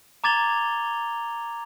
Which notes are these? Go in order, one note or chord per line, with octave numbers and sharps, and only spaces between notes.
A#5 D6 G#6 A6 F7 G7